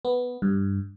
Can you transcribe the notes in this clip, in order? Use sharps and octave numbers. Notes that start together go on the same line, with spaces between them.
B3
G2